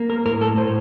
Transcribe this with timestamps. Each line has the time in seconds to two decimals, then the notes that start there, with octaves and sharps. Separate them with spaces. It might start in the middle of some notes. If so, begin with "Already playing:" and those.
Already playing: A#3
0.10 A#4
0.26 A2 A#4
0.41 A4
0.57 A2 C5